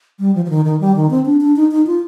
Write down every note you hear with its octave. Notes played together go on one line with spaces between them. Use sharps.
G3
F3
F3
D#3
D#3
G3
D#3
C4
D4
D4
D#4
D#4
F4